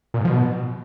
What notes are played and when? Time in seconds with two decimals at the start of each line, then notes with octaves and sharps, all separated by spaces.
0.14 A#2
0.19 G#2
0.25 F3
0.30 B2